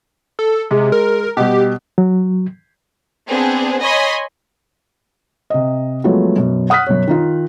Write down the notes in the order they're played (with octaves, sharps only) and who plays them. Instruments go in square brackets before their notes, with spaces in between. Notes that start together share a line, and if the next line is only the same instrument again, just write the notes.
[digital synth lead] A4
[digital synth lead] C3 [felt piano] G#3
[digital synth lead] A#4
[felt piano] B2 G3 [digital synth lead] G4
[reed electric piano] F#3
[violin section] B3 C4 D4 G#4
C#5 D#5 G#5 B5 C6
[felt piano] C3 D#5
F3 F#3 G#3 A3 B3
F#2 B2
F#5 D#6 F6 F#6 B6
F#2 B2 C#5
D#3 D#4 F4